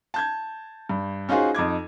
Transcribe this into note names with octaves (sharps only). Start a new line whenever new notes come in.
A5 G6 G#6
G2
C#4 D#4 F4 F#4 G#4 C5
F2 D#4 D6 G#6